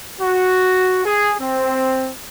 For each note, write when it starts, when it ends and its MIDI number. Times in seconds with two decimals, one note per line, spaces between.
0.21 1.00 66
1.05 1.35 68
1.40 2.11 60